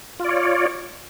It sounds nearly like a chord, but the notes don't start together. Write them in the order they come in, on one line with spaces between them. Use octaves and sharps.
F4 D5 C#5